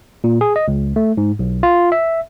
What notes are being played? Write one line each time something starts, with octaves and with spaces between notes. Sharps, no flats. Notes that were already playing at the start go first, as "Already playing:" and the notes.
A#2
G#4
D#5
C#2
A3
G#2
B1
F4
E5